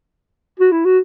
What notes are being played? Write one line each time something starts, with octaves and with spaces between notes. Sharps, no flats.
F#4
E4
F#4